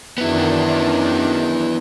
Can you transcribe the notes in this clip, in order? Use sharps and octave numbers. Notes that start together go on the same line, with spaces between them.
F#2 D#3 B3 D4 E4